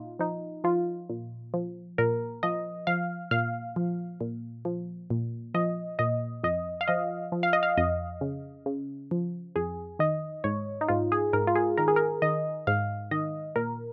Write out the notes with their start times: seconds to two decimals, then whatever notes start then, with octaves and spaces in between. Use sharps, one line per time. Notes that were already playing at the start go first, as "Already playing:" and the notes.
Already playing: A#2 D#4 F4
0.19 F3 D#4
0.64 F3 F4
1.10 A#2
1.54 F3
1.98 A#2 A#4
2.43 F3 D#5
2.87 F3 F5
3.31 A#2 F5
3.76 F3
4.21 A#2
4.65 F3
5.10 A#2
5.54 F3 D#5
5.99 A#2 D#5
6.43 F2 D#5
6.81 F5
6.88 F3 D#5
7.32 F3
7.43 F5
7.53 D#5
7.63 F5
7.78 F2 D#5
8.21 C#3
8.66 C#3
9.11 F3
9.56 F2 G#4
9.99 D#3 D#5
10.44 G#2 C#5
10.81 D#4
10.88 G#2 F4
11.12 G#4
11.33 G#2 A#4
11.47 F4
11.55 G#4
11.78 D#3 A#4
11.88 G#4
11.96 A#4
12.22 D#3 D#5
12.67 G#2 F5
13.11 D#3 D#5
13.56 A#2 A#4